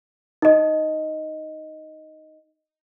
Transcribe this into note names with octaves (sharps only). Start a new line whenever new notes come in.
D#4 D#5